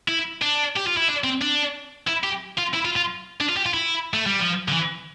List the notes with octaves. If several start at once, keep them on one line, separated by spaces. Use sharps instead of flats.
E4
D4
G4
F4
E4
D4
C4
D4
E4
G4
F4
E4
F4
F4
D4
F4
G4
F4
E4
A3
G3
F3
D3
E3